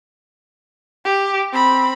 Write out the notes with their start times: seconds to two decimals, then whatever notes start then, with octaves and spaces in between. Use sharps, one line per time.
1.05 G4
1.53 C4 B5